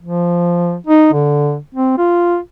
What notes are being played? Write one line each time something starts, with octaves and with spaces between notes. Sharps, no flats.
F3
D#4
D3
C4
F4